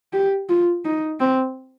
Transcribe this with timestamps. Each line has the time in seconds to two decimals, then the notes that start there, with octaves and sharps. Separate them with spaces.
0.13 G4
0.49 F4
0.84 D#4
1.20 C4